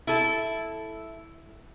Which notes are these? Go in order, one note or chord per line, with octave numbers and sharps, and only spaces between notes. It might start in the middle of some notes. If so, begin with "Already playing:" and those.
E4 A4